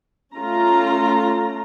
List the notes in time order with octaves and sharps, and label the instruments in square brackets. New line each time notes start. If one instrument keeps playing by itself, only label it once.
[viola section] A3 C#4 F4 A#5